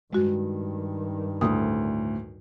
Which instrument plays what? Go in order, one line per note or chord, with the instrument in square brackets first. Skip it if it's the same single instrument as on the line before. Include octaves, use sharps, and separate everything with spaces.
[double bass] G2 D#3 [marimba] G#3 F#4
[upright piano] D2 A2 [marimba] D#6